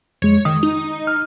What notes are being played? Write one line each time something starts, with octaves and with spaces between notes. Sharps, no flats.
F2 G#3 C#5
D#3 D#6
D#4
F6